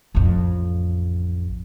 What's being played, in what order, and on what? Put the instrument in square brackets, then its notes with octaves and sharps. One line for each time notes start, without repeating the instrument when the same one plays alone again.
[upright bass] A1 F2